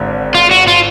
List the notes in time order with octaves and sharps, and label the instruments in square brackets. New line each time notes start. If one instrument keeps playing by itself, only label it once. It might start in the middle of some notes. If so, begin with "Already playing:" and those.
Already playing: [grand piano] G#1 D3
[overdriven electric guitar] F4
F#4
F4